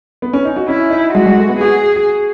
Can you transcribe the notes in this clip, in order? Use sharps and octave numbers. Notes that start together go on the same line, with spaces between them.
B3
C#4
D#4
F#4
C#4 E4
D#4
G#3 F#4
G#3
A3
B3
F#4 G#4